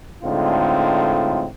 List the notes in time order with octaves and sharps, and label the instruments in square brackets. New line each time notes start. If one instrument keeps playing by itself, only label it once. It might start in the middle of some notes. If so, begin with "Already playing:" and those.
[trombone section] A2 D3 G#3 C4 D#4 F4